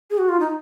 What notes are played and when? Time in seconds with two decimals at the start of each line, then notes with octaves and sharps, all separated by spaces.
0.11 G#4
0.18 F#4
0.29 F4
0.40 D#4